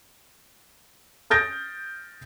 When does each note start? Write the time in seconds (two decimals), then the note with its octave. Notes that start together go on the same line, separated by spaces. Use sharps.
1.30 D#6 F6 G6 A6 A#6 D7